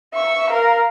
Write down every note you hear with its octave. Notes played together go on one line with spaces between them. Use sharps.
E5 C#6
A#4 F5